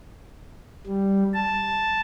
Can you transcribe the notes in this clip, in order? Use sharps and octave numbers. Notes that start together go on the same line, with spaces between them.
G3
A5